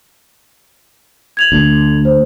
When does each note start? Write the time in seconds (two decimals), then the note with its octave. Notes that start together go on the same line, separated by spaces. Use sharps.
1.37 G#6 F7 F#7
1.52 D2
2.05 C5